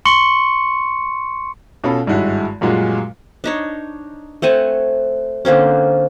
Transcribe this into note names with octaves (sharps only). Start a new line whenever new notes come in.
C6 C#6 C#7
B2 C#4 F4 A4 B5
G#1 G2 G#3 E4 F#4
F#2 A#2 G3 G#3 F4 F#4
D4 D#4 C#5
A3 C4 F#5 G#5
D3 A#3 C4 C#4